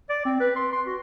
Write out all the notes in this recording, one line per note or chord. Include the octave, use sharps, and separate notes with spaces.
D5
C4
B4
C6
C6
F#4